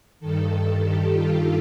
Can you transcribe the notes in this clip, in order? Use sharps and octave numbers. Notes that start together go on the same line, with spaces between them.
G2 D#3 A4
G4
F4